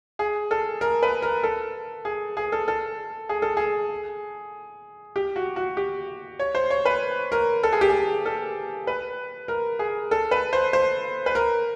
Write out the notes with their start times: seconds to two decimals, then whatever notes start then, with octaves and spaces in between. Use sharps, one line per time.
0.19 G#4
0.51 A4
0.81 A#4
1.03 B4
1.22 A#4
1.43 A4
2.05 G#4
2.37 G#4
2.52 A4
2.68 A4
3.29 G#4
3.42 A4
3.57 G#4
5.16 G4
5.36 F#4
5.56 F#4
5.77 G4
6.39 C#5
6.55 C5
6.70 C#5
6.85 B4
7.32 A#4
7.63 A4
7.72 G#4
7.81 G4
7.90 G#4
8.26 A4
8.87 B4
9.48 A#4
9.79 G#4
10.11 A4
10.31 B4
10.53 C5
10.73 C5
11.26 B4
11.35 A#4